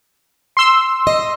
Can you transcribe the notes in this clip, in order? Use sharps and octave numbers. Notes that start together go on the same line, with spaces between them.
C6 E6
D#5